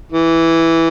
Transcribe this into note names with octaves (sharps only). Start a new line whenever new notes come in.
E3